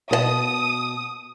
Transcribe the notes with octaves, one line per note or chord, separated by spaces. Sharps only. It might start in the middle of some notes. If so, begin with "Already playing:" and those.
B2 C5 A5 D#6